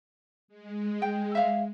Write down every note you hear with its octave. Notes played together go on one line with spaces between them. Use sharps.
G#3
G5
E5 F5